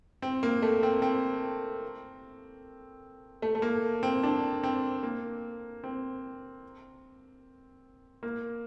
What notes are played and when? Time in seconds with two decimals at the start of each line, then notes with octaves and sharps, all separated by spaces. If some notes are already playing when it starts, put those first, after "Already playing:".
0.22 C4
0.43 A#3
0.62 A3
0.83 C4
1.02 C4
3.42 A3
3.55 A3
3.62 A#3
4.03 C4
4.23 D4
4.63 C4
5.03 A#3
5.84 C4
8.23 A#3